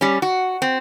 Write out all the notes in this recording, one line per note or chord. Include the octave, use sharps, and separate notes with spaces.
G3 C#4
F#4
C4